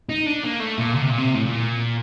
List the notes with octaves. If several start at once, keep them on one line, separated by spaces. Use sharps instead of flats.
D#4
D4
A#3
A3
A#2
D3
C3
A#2
C3
A2
A#2